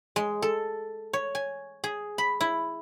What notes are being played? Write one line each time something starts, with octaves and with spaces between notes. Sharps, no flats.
G#3
A4
C#5
G#5
G#4
B5
E4